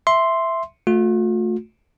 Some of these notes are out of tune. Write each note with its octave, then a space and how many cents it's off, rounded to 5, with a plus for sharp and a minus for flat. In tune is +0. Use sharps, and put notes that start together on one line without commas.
E5 +0 C6 +0
A3 +0 F4 +45